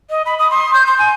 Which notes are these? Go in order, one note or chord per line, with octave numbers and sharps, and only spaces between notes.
D#5
B5
D#6
C6
G6
C6
G#5